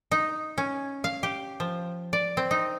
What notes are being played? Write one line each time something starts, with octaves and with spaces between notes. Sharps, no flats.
D#4
C#4
F5
G4
F3
D5
C4
D#4